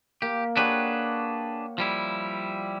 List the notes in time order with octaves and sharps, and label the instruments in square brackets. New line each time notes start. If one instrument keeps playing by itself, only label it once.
[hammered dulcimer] A#3 [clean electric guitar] G4
[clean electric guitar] D4 G#4 B4 [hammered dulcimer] G4 C#5 F#5
[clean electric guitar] F3 G3 E4